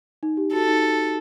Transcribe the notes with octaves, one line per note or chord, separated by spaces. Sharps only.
D#4
G4
F#4 A4
D#4